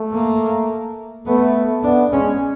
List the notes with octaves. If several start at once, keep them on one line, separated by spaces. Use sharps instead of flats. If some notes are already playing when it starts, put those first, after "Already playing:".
Already playing: A3
A#3
A3 B3
B3 D4
G#3 C#4